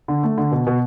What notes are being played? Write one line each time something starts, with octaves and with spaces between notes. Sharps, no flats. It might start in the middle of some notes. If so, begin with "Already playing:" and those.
D3
A3
D3
B2
B2